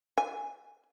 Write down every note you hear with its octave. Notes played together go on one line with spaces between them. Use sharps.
G#5